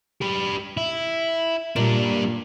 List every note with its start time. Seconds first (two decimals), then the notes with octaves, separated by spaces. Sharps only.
0.21 G4 B4
0.77 E4
1.76 A#2 G3 D4